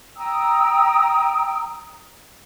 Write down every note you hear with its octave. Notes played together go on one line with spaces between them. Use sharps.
G5 A#5 D#6 E6